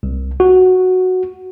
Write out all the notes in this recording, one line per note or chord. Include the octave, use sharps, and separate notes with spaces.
C2
F#4